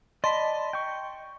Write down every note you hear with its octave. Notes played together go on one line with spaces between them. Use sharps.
D5 D#5 A5 B5 C6
G5 C#6